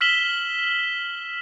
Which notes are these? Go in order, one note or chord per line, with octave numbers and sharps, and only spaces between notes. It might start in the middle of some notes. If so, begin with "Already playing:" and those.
E6 F6 B6 E7 F#7 G7